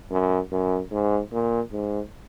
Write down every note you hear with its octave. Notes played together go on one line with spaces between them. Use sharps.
F#2
F#2
G#2
A#2
G#2